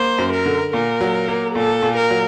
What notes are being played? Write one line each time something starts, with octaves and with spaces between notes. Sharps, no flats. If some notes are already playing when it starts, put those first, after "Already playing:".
Already playing: A#3 C5
F#2
A#4
D3
A#2 A#4
F#3
A#3
A#2 A4
A#2
A#4
F#3